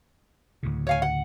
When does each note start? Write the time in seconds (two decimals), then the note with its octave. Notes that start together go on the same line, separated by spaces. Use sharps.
0.63 D2 A2 C#3
0.87 C#5 F5 G#5
1.02 F#5